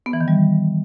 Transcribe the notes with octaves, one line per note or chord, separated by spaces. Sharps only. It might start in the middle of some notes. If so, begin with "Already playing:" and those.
B3
E3
D#3
G3